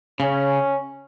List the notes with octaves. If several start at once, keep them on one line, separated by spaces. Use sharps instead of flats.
C#3 C#4